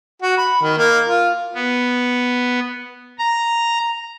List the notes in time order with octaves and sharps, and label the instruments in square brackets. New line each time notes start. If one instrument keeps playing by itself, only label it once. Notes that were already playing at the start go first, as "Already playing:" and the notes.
[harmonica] F#4
B5
D#3
A#3
F4
[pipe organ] B3
A#5